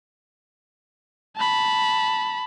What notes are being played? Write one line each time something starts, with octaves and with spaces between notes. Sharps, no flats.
A5 B5